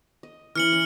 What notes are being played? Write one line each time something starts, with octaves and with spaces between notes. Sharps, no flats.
D#5
E3 C#4 F6 C#7 F#7
C#4